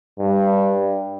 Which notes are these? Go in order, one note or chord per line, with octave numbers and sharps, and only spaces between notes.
G2